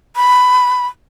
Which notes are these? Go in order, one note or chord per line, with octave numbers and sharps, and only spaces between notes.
B5